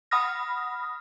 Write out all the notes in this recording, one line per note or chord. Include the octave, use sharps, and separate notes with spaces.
F#5 B5 D#6 F6 A#6